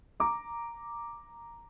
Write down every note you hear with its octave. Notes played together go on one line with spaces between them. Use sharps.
A#5 D6